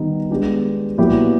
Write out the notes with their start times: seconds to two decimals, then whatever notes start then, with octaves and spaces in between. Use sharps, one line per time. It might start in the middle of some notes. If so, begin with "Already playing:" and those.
Already playing: D#3 G3 B3 D#4
0.31 G#3 B3 D4 G4
0.98 A#2 F#3 B3 E4 G4